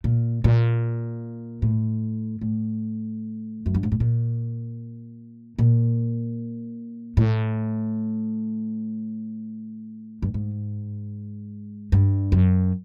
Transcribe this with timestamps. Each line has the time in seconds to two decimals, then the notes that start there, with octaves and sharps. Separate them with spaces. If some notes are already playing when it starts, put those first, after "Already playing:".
0.04 A#2
0.44 A#2
1.62 A2
2.41 A2
3.66 F#2
3.75 G2
3.83 G#2
3.92 A2
4.00 A#2
5.58 A#2
7.17 A2
10.22 G2
10.34 G#2
11.92 G2
12.32 F#2